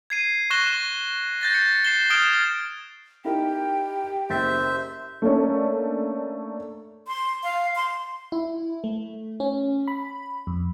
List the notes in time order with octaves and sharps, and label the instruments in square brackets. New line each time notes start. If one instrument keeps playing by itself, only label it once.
[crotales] G#6 C7 D#7
C#6 F#6 A#6 E7 G7
G6 A6 A#6
C#7
C7 E7 G7
D#6 F6 G#6 D7 E7 G7
[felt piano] D#4 E4 A#4 [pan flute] G4 [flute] G5
[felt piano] F#1 A6 B6 [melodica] C5 E5
[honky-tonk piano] A3 A#3 C#4 D4
[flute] C6
F5
C6
[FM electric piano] E4
A3
C#4
B5
F2